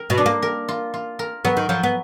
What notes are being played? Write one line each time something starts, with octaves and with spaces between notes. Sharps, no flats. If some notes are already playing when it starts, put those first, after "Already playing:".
Already playing: A#4
B2
D4
A#3
A#4
F4
F4
A#4
F#3 B3
D#3
F3 F#3
B3